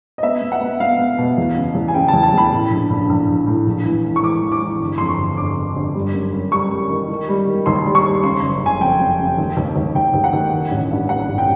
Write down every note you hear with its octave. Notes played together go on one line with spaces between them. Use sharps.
D#5
B3 E5
B3
F#5
B3
B3 F5
B3
B2
E2
C#3
E2
G#5
C#3 G5
E2 A5
A5
E2 B5
A2
A#1
A#1
A#1
A#1
A2
A#1
E3
A2
C#6
E3 D6
E3
D6
E3
G1
F2 C6
C#6
G1
G1 D6
G1
G1
G3
F#2
F#2
G3 C#6
G3
D#3
D#3
G3
D#3
D#2 C6
G3
C#6
G3
C#3 C6
F#1
F#1 G#5
F2 G5
F2
C#3
D#2
D#2
D#2
D#2 G5
D#2
F#5
D#2
D#3
A1
G2
G2 F#5
A1
G5